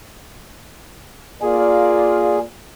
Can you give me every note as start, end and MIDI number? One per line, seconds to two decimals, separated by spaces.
1.42 2.43 58
1.42 2.43 65
1.42 2.39 68
1.42 2.43 74